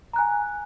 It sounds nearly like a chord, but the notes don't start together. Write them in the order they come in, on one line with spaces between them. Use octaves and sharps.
A#5 F#6 G#5